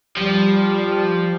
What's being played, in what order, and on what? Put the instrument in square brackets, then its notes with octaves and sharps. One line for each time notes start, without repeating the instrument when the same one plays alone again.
[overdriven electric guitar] F3 [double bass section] G3